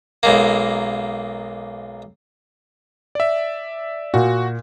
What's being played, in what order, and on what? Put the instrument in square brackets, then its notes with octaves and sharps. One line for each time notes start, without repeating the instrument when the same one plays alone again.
[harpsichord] B1 G#3 A#3
[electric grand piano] D5 E5
[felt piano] A#2 [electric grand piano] F#4